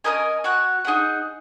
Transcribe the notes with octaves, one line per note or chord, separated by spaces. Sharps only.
C#4 A#4 D#5 G#5
F#4 C#5 F#5
D#4 G#4 F#5